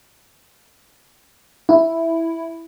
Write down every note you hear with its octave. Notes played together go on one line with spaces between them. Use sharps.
E4